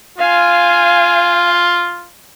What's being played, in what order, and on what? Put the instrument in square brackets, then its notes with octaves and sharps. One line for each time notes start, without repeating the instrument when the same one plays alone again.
[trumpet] F4 [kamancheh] F5 G#5